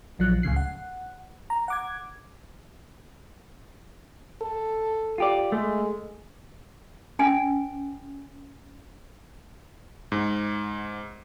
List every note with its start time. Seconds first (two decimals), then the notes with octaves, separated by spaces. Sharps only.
0.19 A#1 F3 F#3 F#6
0.43 C#2 A2 C#3 C7
0.56 F#5
1.50 A#5
1.68 F#5 D6 G#6
4.42 A4
5.18 F4 G4 D5
5.52 G#3 A3
7.19 C#4 G#5
10.12 G#2